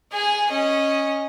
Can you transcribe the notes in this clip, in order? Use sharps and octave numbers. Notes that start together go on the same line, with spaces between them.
G#4 G#5
C#4 D#5